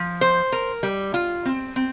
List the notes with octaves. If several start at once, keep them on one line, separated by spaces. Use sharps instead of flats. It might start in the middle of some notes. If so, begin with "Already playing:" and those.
Already playing: F3
C5
A#4
G3
F4
C4
C4